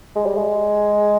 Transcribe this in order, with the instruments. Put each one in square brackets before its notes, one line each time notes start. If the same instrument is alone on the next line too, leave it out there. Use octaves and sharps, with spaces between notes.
[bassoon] G#3
G3
G#3